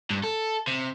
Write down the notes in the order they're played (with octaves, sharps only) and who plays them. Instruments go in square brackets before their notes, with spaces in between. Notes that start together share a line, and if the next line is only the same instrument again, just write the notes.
[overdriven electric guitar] G2
A4
C3